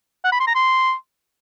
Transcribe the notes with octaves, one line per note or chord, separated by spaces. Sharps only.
F#5
B5
C6
A#5
C6